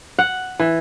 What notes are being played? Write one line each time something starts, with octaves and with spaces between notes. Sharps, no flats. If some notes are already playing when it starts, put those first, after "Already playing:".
F#5
E3